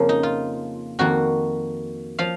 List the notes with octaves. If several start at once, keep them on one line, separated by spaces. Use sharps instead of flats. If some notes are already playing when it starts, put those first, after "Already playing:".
Already playing: F2 C#3 F3 A#3
D#4
F4
F2 D#3 A#3 F#4
F3 F5